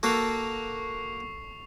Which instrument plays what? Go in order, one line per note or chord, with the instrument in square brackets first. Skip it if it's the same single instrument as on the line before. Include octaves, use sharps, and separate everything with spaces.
[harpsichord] A#3 F#4 B4 [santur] A4 [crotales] C#6 C7 F7